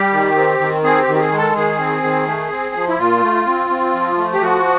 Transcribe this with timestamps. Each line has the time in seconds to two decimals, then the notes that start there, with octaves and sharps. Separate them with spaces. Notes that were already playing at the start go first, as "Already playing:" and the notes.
Already playing: G3 G4
0.13 D#3
0.36 C4
0.60 D#3
0.84 C4 G#4
1.02 G4
1.08 D#3
1.15 G4
1.20 G#4
1.32 G#3
1.38 A4
1.56 D#3 G#4
1.79 C4
2.03 D#3
2.27 A3
2.51 C4
2.75 F3
2.88 E4
2.99 A#2 F4
3.23 A3
3.46 C4
3.70 C4
3.94 F3
4.18 A3
4.33 G4
4.42 F3 F#4